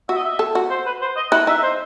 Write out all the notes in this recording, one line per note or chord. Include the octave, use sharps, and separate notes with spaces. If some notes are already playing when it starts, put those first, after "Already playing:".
F#4 E5
D#5
E5
A4
F#4
C5
B4
C5
D#5
E4 F#5
D#4 E5
C5